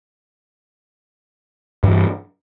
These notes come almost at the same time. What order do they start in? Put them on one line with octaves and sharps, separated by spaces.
G2 E3 G3